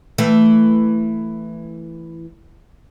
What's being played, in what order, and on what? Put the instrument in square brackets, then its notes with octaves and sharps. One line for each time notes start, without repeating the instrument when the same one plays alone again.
[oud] E3 A3